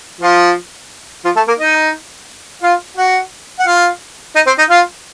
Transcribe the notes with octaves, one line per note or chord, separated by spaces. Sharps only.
F3 F4
F3 F4
A3 A4
A#3 A#4
D#4 D#5
F4 F5
F#4 F#5
F#5
F4 F5
D#4 D#5
C4 C5
D#4 D#5
F4 F5